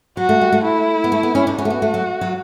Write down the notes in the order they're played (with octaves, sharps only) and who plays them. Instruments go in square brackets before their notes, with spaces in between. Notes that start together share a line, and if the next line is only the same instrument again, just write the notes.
[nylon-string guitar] F#3 [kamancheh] F#4
[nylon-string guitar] A3
G3
A3
[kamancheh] E4
[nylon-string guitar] B3
A3
B3
C#4
D4
[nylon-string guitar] C#4 [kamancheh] F#4
[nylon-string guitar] A3
B3
A3
F#3
F#3